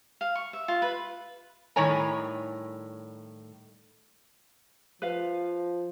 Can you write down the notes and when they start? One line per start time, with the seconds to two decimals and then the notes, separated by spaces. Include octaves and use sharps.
0.21 F5
0.35 C#6
0.53 E5
0.68 F4
0.82 B4
1.76 A2 D#3 G3 C#5 G#5 A#5
5.02 F3 B4 F5